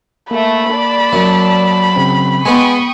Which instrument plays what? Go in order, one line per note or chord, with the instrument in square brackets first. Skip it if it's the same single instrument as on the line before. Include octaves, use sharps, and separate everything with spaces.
[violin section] A3 [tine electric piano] A#3 [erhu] B5
[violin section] D5 A5
[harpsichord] F#2
[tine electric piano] C#3 C4
[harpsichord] G#3 B3 [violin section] G5 C#6 D#6 [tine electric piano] G#5